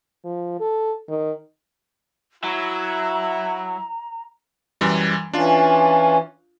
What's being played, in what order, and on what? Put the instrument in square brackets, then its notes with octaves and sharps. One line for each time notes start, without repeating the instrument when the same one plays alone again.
[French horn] F3
A4
D#3
[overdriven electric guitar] F#3 [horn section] E4 [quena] A#5
[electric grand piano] F#2 E3 G3
[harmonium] E3 C#4 [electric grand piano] D4 F4